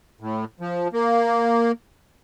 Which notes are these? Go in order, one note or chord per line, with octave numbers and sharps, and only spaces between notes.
A2
F3
A#3